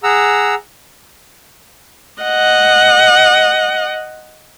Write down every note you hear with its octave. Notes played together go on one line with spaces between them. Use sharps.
G#4 F#5 A#5 E6
D#5 F#5